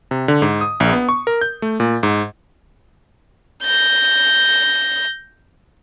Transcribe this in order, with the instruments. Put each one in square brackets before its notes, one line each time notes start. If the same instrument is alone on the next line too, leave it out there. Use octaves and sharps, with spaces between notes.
[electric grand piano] C3
D3
G#2
D#6
A#1
B3
C#6
A#4
G6
A3
A#2
G#2
[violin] G6 A#6